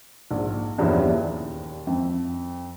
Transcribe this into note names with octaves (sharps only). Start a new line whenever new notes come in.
A#1 G#2
E2 G2 A#2 F3 C#4 E4
D#2
F2